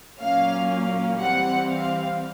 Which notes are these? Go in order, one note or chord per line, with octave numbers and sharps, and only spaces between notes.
A#2 F#3 A#3 C#4 F5
F5
E3 G3 C4 F#5
F5